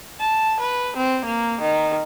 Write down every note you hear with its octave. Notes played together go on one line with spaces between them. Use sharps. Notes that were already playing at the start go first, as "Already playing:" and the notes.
A5
B4
C4
A#3
D#3